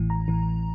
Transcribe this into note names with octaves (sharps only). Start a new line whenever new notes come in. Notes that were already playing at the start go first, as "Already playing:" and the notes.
Already playing: A1 A2 E3
A#5
A1 A2 E3